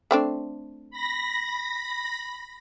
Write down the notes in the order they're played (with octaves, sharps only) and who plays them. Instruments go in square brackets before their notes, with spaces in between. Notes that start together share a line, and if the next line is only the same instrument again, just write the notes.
[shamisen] A3 C4 D4
[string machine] B5 A#6